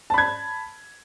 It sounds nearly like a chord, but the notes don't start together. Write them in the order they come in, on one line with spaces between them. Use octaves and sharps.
A5 B5 G#6